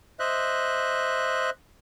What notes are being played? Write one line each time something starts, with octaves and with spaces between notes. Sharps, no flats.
C5 D#5 E5 F#6